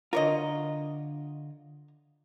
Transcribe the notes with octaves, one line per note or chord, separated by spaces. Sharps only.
D3 F4 A#4 C#5 D#5